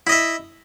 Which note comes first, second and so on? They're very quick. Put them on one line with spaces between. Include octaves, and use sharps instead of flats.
E4 D#5 E5